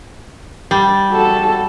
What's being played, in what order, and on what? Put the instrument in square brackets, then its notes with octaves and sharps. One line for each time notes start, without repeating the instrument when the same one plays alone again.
[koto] G3
[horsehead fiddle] F#4 A4